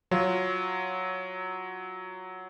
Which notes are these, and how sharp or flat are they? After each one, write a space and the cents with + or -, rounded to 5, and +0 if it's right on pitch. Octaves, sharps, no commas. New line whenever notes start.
F#3 +0 F4 +0